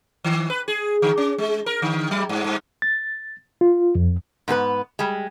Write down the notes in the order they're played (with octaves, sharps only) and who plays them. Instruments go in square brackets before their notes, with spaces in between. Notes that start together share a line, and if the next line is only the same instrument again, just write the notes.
[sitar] D#3
B4
G#4
D3
C#4
G#3
A#4
D3
F#3
G2
G2
[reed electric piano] A6
F4
F2
[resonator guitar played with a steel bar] G#2 B3 G#4 B4
G3 G#3